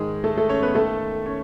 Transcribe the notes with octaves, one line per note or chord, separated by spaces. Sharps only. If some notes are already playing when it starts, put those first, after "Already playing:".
Already playing: G#2 D#3 G#3 G#4
A3 A4
A3 A4
C#4 C#5
B3 B4
D#2 D#3 A3 A4
C#4 C#5